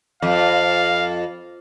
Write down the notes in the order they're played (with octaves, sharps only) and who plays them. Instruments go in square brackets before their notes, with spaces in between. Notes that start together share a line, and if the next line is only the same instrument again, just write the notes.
[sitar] F2 [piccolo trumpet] F5